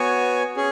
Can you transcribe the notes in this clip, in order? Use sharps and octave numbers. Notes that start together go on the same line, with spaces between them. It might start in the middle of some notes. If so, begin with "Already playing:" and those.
Already playing: B3 F#4 C#5 G#5
C#4 G#4